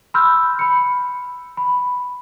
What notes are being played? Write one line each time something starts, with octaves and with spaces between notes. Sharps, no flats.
B5 C6 E6 F6 G6
B5 C#7
B5